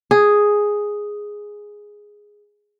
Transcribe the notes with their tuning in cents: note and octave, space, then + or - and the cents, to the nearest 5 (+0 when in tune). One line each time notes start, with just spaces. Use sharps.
G#4 +0